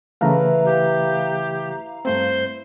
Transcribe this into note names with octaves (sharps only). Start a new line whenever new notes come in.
C#3 E3 A3 E4 B4 F5 A#5
G4
G2 A3 C4 C5